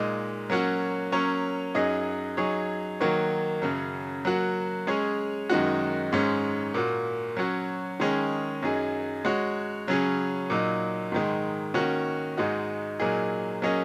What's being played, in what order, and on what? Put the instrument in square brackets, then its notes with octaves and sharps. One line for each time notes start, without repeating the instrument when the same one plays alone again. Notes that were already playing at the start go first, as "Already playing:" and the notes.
Already playing: [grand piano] A#2 G#3 D#4
F#3 A#3 C#4 F#4
F#3 A#3 C#4 A#4 C#5
F#2 F#3 D#4 G#4 D#5
F#3 D#4 G#4 C#5
D#3 F#3 A#3 F#4 C#5
F#2 C#3 F#3
F#3 A#3 F#4
G#3 C#4 G#4 C#5
F#2 D#3 G#3 D#4 F#4
G#2 G#3 C#4
A#2 A#3 F#4
F#3 C#4 F#4
D#3 G#3 C#4 G#4 D#5
F#2 F#3 D#4 G#4
G#3 F#4 C#5
C#3 F#3 C#4 G#4
A#2 F#3 D#4
G#2 D#3 G#3
D#3 A#3 C#4 F#4
G#2 G#3 D#4 F#4
A#2 F#3 A#3 D#4 G#4
F#3 A#3 C#4 G#4 D#5